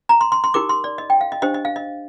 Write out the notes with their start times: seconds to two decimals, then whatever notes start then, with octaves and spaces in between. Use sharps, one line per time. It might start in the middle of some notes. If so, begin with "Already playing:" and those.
0.09 A#5
0.21 C6
0.32 C6
0.44 C6
0.54 D#4 G4 A#4 D6
0.69 C6
0.84 D5
0.98 D#5
1.10 G5
1.21 F5
1.32 D#5
1.42 D4 G4 C5 D#5
1.54 D#5
1.65 F5
1.76 D#5